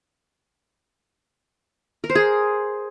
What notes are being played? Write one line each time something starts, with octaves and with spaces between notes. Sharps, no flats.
A#4
C5
G#4